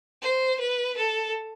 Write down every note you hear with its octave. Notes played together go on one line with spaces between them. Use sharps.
C5
B4
A4